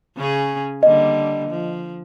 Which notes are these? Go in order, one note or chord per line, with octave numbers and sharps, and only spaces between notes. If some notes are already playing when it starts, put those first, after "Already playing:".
C#3 C#4 G#4
D3 G3 A#3 D#5
F3